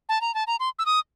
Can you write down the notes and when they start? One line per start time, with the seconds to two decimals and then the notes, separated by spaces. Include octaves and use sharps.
0.09 A5
0.21 A#5
0.34 A5
0.47 A#5
0.60 C6
0.79 E6
0.86 D#6